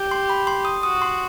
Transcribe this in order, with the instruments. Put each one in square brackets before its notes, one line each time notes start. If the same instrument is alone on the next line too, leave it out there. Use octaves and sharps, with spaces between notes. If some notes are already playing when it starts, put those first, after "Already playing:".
Already playing: [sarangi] G4
[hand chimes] C6
B5
C6
D#6
[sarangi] F#4 [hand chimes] D#6
[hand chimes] C6